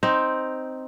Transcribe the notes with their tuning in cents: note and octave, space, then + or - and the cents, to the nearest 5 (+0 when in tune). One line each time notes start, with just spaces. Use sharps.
C4 +0 D#4 +0